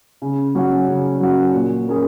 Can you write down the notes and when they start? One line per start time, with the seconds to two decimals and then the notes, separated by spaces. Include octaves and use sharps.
0.22 C#3
0.55 F#3 C#4 F#4
0.88 C#3
1.20 F#3 C#4 F#4
1.54 A#2
1.87 A#3 C#4 G#4